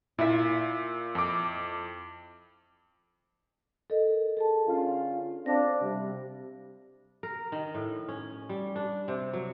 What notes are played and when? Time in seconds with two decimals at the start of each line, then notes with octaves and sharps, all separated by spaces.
0.19 A#2 E4 E5
1.15 F2 D6
3.90 A4 A#4 D#5
4.37 G#4 A4 A5
4.67 D3 C#4 F4
5.46 C4 D4 F5 A#6
5.81 C3 G3
7.23 A#4
7.52 D#3
7.75 A2
8.09 C#4
8.49 G3
8.76 D4
9.08 C3
9.34 F#3